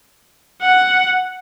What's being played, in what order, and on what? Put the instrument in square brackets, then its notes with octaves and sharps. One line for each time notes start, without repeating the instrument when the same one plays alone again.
[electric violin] F#5